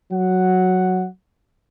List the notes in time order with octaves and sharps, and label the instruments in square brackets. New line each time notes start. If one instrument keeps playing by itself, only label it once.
[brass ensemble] F#3 F#5